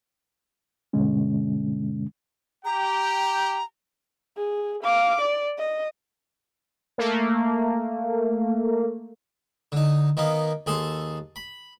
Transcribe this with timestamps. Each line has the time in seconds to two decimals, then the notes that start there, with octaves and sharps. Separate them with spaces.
0.93 G2 B2 D3 G#3 C#4
2.65 G4 G5 A#5
4.37 G#4
4.83 F5 D6
5.21 D5
5.59 D#5
6.98 A3 A#3
9.72 D3 D#4
10.17 D#3 A#3 B3 D#4
10.66 D#2 G#4 A4 A5 C6
11.36 B5